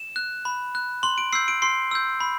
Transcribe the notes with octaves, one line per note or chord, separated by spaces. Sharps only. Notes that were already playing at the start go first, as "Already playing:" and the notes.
Already playing: E7
F#6
B5
F#6
C6 F#7
D7
E6 G6 C7
D7
C6 C7
E6 G6
B5